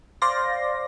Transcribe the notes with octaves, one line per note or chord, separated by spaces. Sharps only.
C5 D5 F5 C6 A#6